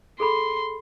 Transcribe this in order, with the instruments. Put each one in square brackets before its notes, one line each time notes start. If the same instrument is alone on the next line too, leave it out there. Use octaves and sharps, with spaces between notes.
[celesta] G#4 A4 B5 [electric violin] C6